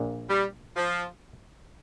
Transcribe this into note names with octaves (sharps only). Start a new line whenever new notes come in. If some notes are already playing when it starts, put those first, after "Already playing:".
Already playing: A#1 A#2
G3
F3